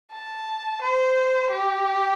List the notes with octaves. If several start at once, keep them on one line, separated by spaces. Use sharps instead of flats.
A5
C5
G4